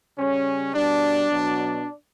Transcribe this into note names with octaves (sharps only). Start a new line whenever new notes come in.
C#3 G3 C#4
B2 G3 D4
B2 F#3